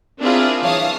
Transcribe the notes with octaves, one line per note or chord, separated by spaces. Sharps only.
C4 D4 E4 F4 G#4 A#4
E3 C#5 F5 A5 D#6